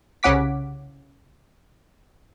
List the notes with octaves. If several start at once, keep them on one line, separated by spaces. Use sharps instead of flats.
C2 C#3 C#4 F#5 D6 B6